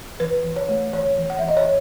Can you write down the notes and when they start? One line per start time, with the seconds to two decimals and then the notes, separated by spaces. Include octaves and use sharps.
0.20 E3 B4
0.44 E3
0.56 C#5
0.68 A3
0.93 E3 C#5
1.17 E3
1.30 F#5
1.39 E3 E5
1.48 D#5
1.57 C#5